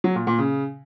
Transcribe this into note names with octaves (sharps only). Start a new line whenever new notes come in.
F#3
A#2
A#2
C#3